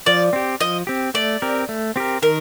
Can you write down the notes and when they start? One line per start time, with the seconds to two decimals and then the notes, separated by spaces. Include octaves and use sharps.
0.06 F3 D5
0.33 C4 G4
0.60 F3 D#5
0.87 C4 G4
1.14 A3 D5
1.42 C4 G4 A#4
1.69 A3
1.96 C4 G4 A#4
2.22 D#3 A#4